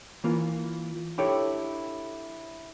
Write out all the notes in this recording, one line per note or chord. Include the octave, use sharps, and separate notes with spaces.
E3 A#3 F4
D4 E4 G4 A4 C#5 G5